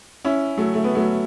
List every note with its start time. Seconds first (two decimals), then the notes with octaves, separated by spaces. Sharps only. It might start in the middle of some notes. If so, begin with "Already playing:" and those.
0.25 C#4 E4
0.57 F#3 A3
0.74 A3
0.84 B3
0.95 F#3 A3